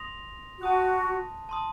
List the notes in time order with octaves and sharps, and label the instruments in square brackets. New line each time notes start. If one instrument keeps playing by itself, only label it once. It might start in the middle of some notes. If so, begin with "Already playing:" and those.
Already playing: [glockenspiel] C6 D#6 A#6 F7
[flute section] F#4 [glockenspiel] A5 D#6 F#6
[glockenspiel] A5 C6 D#6